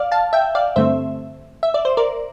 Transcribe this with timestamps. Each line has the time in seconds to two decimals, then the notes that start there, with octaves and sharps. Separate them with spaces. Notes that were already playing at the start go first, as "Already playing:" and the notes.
Already playing: D5 F5
0.12 F5 A5
0.33 E5 G5
0.55 D5 F5
0.76 G2 D3 A3 C4 C5 E5
1.63 E5
1.74 D5
1.85 C5
1.97 A#4 D5